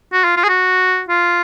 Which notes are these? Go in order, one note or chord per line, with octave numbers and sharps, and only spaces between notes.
F#4
F4
F4
G#4
F#4
F4